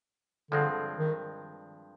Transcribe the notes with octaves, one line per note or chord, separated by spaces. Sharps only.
G2 D3 F3 G#3 C4
D#3